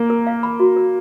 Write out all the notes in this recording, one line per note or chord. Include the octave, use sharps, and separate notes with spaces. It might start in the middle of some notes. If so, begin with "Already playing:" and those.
Already playing: A#3
A#4
F5
B5
F#4
A#4